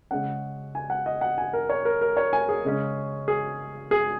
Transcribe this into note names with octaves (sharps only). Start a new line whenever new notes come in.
C#3 G#3 C#4 F#5
G#5
F#5
D#5
F#5
G#5
A#4
C#5
A#4
A#4
C#5
G#5
G#4
C#3 G#3 C#4
G#4
G#4